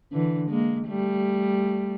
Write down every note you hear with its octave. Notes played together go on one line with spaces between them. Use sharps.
D3 E3
G#3 A#3
G3 A3